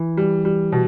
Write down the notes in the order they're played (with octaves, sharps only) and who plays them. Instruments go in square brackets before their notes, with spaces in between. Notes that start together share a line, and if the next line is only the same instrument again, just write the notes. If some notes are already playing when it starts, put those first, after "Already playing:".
Already playing: [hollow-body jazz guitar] E3
[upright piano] G3
G3
B2